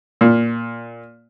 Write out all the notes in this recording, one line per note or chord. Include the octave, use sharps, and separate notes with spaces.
A#2